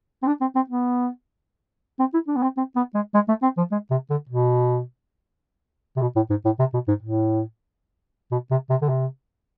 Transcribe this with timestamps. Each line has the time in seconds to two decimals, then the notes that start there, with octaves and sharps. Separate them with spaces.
0.23 C4
0.27 D4
0.41 C4
0.55 C4
0.69 B3
1.99 C4
2.13 E4
2.28 D4
2.36 B3
2.42 C4
2.57 C4
2.76 B3
2.95 G#3
3.14 G#3
3.28 A3
3.43 C4
3.57 F3
3.72 G#3
3.91 C3
4.10 D3
4.29 B2
5.96 C3
6.02 B2
6.16 A2
6.30 G#2
6.45 A2
6.59 C3
6.74 B2
6.88 G#2
7.02 A2
8.31 B2
8.51 C3
8.70 C3
8.82 D3
8.89 C3